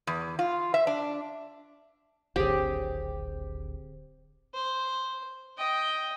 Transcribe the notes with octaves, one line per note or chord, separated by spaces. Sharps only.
E2
F4
E5
D4
D1 G#1 D3 C4 G4 G#4
C5
D#5 G5